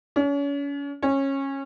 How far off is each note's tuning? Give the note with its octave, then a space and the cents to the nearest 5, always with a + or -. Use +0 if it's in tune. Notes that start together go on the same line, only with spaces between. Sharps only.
C#4 +35
C#4 -20